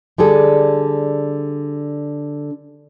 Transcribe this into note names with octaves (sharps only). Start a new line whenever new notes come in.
D3 G3 G#4 A4